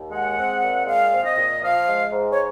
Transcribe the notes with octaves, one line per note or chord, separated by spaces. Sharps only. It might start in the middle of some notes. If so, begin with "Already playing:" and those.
Already playing: D#2
G#3 F#5
C4
A#2
G#3 F5
C4
D#5
A#2
F3 F5
G#3
G#2
C#5